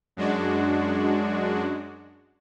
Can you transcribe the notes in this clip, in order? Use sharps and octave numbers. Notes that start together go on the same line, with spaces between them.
F#2 G#3 D4 F#4